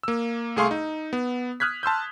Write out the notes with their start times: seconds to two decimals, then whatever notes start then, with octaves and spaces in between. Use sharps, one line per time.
0.03 A#3 E6
0.56 C2 A3 G#4 F5 C6 C#6
0.71 D#4
1.13 B3
1.60 D#6 F6 F#6 G#6 B6
1.83 A5 C6 E6 G6